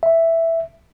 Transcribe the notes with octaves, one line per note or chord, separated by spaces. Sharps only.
E5